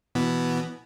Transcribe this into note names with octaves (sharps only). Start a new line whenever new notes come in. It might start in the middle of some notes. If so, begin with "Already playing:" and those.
B2 E3 B3